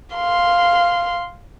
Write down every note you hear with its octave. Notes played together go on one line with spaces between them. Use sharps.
F5 C6